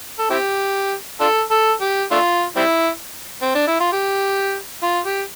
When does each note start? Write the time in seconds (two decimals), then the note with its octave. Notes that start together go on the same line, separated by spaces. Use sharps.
0.18 A4
0.30 C4 E4 G4
1.20 D4 F4 A4
1.51 A4
1.81 G4
2.11 A3 D4 F4
2.56 G3 C4 E4
3.42 C4
3.55 D4
3.67 E4
3.80 F4
3.92 G4
4.83 F4
5.06 G4